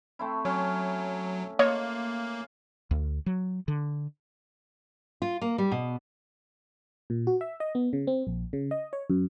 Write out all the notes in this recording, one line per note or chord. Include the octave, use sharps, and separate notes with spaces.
A3 C4 E4
F#3 C#4
A#3 F4 C#5 D#5
D2
F#3
D3
F4
A#3
G3
B2
A#2
F#4
E5
D#5
B3
C#3
C4
A#1
C#3
D#5
C#5
F#2